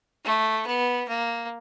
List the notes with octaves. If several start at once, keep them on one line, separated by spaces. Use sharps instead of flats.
A3
B3
A#3